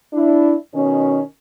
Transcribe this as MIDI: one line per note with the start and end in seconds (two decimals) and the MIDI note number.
0.14 0.55 62
0.14 0.55 64
0.74 1.21 47
0.74 1.21 51
0.74 1.21 61